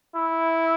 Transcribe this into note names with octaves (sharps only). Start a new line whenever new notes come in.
E4